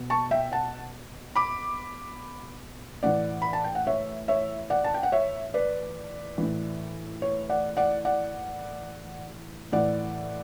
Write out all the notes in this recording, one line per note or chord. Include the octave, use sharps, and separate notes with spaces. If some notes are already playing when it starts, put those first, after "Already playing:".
Already playing: B2
A5 C#6
E5 G5
F#5 A5
B5 D6
A2 E3 D5 F#5
B5
A5
G5
F#5
C#5 E5
C#5 E5
D5 F#5
A5
G5
F#5
C#5 E5
B4 D5
A2 E3
C#5
D5 F#5
D5 F#5
D5 F#5
A2 E3 D5 F#5